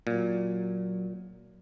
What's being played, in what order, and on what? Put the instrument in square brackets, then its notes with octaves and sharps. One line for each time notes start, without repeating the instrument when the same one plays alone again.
[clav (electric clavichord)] A#2 [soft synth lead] F#3